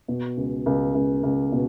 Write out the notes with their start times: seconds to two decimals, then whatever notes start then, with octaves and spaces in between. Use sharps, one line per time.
0.08 B2
0.37 C#2
0.66 C#2
0.95 C#2
1.23 C#2
1.52 B2